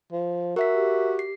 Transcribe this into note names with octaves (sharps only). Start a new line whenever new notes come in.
F3
F#4 A#4 E5 B6
G4
C7